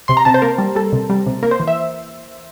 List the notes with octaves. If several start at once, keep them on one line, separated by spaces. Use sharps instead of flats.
C3 C6
A#5
C3 A5
C5
A#3 A#4
G3
G3 A4
C3
G3
C3
A#3 A#4
C5
E3
E5